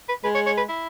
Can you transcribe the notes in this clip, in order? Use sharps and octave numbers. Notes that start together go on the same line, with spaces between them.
B4
G#3 B4
C#5
C#5
B4
E4